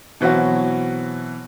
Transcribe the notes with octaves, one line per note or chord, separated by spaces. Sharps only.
B2 E3 F#3 C4 F#4